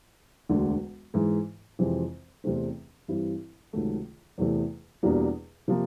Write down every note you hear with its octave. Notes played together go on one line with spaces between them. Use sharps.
E1 D2 D3
G#2 E3 G#3
F2 C3 E3 G#3 C4
E2 C3 E3 A3 C4
G2 E3 G3 C4 E4
C#2 C3 D#3 F#3 A3
E2 C3 E3 A3
E2 B2 G3 A#3 D4
C3 F3 A#3